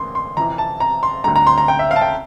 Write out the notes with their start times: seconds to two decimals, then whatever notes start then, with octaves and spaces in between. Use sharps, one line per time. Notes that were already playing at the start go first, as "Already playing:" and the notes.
Already playing: A1 G2 E3 A#3 C6
0.15 C6
0.37 F2 C3 E3 A#5
0.58 A5
0.80 A#5
1.03 C6
1.24 D2 D3 G3 A#5
1.36 A#5
1.47 C6
1.58 A#5
1.68 G5
1.79 E5
1.91 F5
1.96 A5
2.01 G5